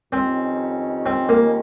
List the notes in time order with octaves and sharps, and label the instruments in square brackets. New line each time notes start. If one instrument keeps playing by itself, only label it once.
[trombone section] F2 D#3 G3 C#4 [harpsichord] C4
[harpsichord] C4
A#3